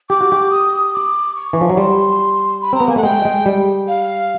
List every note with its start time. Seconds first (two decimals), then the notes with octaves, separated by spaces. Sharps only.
0.10 G4 D6
0.21 F#4
0.32 G4
0.51 D#6
0.94 D6
1.35 C#6
1.53 E3
1.61 F3
1.70 F#3
1.77 G3 C6
2.61 B5
2.73 C4 A#5
2.80 B3
2.88 A#3 G#5
2.96 A3 F#5
3.03 G#3 G5
3.25 G#3
3.46 G3
3.88 F5